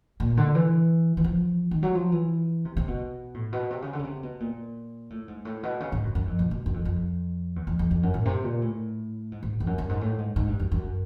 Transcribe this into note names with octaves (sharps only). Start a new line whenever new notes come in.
A#2
D3
E3
E3
F3
D#3
F#3
F3
E3
C3
C3
B2
A2
B2
C3
C#3
D3
C#3
C3
B2
A#2
A2
G#2
A2
B2
C#3
G#2
F#2
F#2
F2
B2
B2
F#2
F2
F2
E2
F2
F2
F2
F#2
A2
C3
A#2
A2
G#2
G#2
F2
F#2
G2
G#2
A2
G#2
G#2
G2
F#2
F#2